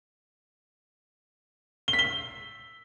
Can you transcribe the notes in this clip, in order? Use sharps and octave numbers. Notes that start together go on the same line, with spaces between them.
G7
B6
G7